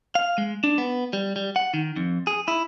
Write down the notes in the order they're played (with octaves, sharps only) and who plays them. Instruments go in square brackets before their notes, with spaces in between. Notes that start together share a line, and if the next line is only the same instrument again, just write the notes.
[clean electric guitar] F5
G#3
D4
B3
G3
G3
F#5
D#3
F2
G#4
E4